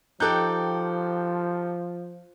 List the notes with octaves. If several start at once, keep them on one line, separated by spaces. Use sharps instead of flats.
F3 D#4 G4 A4 G5 F#6 G6